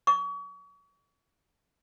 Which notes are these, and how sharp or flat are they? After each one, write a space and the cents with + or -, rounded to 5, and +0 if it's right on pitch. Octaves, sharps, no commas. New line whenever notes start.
C#6 +40